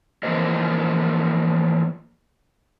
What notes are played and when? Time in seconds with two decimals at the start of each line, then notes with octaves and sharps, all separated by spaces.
0.23 E3 F3 A#3 C5 D#5